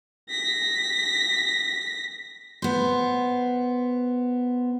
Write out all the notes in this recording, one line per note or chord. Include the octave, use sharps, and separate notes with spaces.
A#6 B6
B3 C5